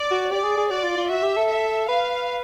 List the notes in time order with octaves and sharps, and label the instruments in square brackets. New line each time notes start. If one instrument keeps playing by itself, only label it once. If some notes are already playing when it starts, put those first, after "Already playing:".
Already playing: [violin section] D5
[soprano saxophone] F#4
[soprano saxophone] G4 [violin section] D5
[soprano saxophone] G#4
G#4
[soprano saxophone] F#4 [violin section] D5
[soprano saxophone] F4
F4
[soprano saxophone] F#4 [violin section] E5
[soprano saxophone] G4
A4
[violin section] E5
[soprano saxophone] B4 [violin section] F5